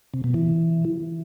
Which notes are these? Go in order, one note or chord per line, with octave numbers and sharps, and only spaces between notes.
C3
B2
E3